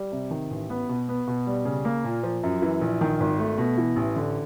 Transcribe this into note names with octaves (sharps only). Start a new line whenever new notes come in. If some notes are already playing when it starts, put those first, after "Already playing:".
Already playing: G3
C3
D#3
A1
B3
B2
B3
B2
G3
C#3
A#3
A#2
F3
F#2
E3
A#1
D#3
G#1
A3
B2
E3
A1
D3